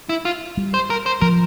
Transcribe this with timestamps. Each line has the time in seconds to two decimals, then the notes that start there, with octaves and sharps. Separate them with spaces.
0.09 E4
0.25 F4
0.57 G3
0.74 C5
0.90 A#4
1.06 C5
1.21 F3 A#4